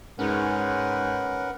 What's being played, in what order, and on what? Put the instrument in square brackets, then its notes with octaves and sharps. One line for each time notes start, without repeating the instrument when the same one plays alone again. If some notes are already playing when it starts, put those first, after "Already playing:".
[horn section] G#2 [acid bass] C#4 [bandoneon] A#4 B4 [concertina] F#5